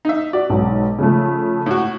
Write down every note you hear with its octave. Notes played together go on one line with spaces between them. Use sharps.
D#4 E5
F#4 D5
B1 G#2
C#3 F3 A3
A2 F#4